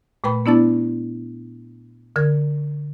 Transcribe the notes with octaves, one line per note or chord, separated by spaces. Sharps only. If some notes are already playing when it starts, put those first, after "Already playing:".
A#2 A3 B4 G5 B5
B3 D4 E4 D5 A5 A6
D3 A#4 G#6